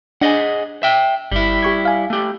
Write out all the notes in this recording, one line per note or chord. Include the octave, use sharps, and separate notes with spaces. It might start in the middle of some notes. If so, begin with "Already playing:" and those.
D4 G#4 D#5 F#5 G#5
E5 G5
G1 G3 E4
G4 C#6 G#6
F5 G#5
A3 G4